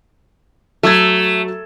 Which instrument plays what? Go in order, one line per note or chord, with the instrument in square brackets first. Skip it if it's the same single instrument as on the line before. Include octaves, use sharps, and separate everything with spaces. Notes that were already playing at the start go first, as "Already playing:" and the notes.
[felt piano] F#3 E6 G#6 [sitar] A3